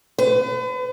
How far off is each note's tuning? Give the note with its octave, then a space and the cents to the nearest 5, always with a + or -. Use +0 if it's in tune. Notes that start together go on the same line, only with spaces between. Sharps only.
B4 +40